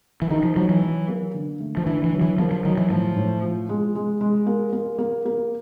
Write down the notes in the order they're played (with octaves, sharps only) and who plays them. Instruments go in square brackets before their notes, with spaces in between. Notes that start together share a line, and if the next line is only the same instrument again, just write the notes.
[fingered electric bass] E3
[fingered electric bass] D#3 [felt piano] D#4
[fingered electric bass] F3
[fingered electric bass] F3 [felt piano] F#3
[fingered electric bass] E3
[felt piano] F#3
A#3
D3
A3
[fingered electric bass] F3
[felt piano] D3 [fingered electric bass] E3
[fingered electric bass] E3
[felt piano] F#3
[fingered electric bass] E3
[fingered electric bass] F3 [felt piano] A#3
[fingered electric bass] F3
[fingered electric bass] D#3 [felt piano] F#3
[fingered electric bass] E3
[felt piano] A2 [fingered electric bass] F3
[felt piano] A2
F3
G#3
G#3
G#3
A#3
A#3
A#3
A#3